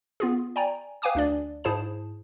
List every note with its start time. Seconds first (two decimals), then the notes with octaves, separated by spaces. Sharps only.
0.20 B3 F4 G#4
0.56 D5 G5 G#5 A#5
1.02 B4 F5 G5 G#5 D6 D#6
1.15 D2 D4 D5
1.64 G#2 E4 G#4 C5 A5 E7